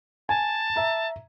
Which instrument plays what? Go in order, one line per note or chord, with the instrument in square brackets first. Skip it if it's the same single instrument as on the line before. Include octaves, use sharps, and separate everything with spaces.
[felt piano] G#5 [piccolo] A5
[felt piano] E5 A#5